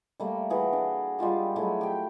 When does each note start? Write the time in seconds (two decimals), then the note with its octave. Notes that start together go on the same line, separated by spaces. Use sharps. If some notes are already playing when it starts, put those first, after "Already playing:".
0.20 G3 A3 A#3 E5
0.50 E3 F#4 G#4
0.73 D4
1.19 G3 G#3 F4 G4
1.56 F#3 G#3 A3 E4
1.81 G4 G5